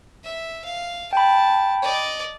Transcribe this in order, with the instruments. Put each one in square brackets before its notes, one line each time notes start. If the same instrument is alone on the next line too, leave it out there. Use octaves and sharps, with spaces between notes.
[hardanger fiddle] E5
F5
[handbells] G5 B5 [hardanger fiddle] A5
[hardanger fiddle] D5 D#5